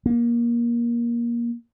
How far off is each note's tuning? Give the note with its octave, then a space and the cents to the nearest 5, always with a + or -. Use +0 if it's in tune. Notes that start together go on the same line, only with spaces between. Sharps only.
A#3 +20